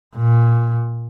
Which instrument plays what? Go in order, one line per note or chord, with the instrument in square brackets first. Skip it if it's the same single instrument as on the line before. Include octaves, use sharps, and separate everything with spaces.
[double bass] A#2